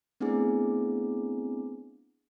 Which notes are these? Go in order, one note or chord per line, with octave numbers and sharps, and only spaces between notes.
A3 B3 C4 D4 E4 G#4